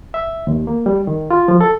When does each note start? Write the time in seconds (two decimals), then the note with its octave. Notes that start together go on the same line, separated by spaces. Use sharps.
0.14 E5
0.47 D#2
0.67 A#3
0.86 G3
1.07 D#3
1.31 F4
1.48 F3
1.61 A4